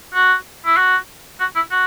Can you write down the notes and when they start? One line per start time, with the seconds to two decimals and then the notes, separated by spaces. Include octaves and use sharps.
0.14 F#4
0.66 E4
0.77 F#4
1.40 F#4
1.56 E4
1.71 F#4